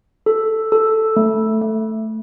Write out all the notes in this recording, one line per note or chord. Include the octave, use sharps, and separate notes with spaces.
A4
A4
A3
A3